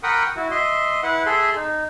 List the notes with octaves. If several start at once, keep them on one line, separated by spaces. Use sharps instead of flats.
A#4 F#5 G5 B5 C#6 D#6
E4 F#4
D#5 E5 C6
E4 B4 F#5
G#4 A4 E5 C6
D#4